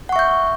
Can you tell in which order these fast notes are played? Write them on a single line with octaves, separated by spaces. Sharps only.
F#5 C#6 E5 G6